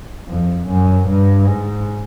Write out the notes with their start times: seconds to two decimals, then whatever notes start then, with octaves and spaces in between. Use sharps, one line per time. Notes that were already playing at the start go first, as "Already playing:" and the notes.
0.28 F2
0.67 F#2
1.07 G2
1.46 G#2